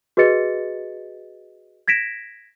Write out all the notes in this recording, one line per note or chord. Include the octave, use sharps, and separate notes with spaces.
F#4 G#4 B4 D#5 A6 C#7
G#6 A#6 B6 D7 E7